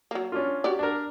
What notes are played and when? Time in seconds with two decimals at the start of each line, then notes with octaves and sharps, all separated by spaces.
0.11 F#3 A#3
0.32 C#4 D4 F4
0.64 F#4 G4 D5
0.79 D4 A#4